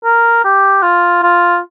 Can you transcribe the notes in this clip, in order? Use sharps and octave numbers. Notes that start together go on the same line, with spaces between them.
A#4
G4
F4
F4